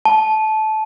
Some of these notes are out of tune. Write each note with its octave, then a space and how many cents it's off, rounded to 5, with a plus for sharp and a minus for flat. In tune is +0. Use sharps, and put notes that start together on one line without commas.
A5 -20